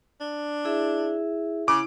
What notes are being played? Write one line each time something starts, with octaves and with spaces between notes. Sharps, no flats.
D4
E4 G#4 E5
C#3 E4 D6